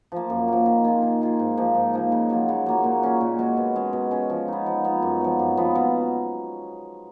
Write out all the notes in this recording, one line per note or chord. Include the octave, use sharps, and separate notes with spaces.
F3 A#3
F#2
F3 A#3
D#3
A#3 F4 G#4
D#3
A#3 F4 G#4
G#2
F3 A#3 D#4
G#2
F3 A#3 D#4
C#3
F#3 A#3 F4
C#3
F#3 A#3 F4
A#2
G#3 C#4 F#4
A#2
G#3 C#4 F#4
B2
G#3 C#4
B2
G#3 C#4
F3
B3 D#4
F3
B3 D#4
F#2
F3 B3
F#2
F3 B3
B2